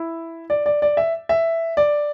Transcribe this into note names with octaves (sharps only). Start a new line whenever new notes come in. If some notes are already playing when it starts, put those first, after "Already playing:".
Already playing: E4
D5
D5
D5
E5
E5
D5